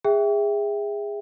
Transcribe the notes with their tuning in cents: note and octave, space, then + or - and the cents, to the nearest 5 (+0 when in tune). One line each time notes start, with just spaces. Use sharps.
G#4 -20 E5 +0 G5 +0